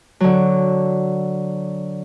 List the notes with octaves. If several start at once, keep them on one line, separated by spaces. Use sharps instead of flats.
D3 F#3